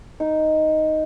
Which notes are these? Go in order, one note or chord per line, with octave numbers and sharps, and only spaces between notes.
D#4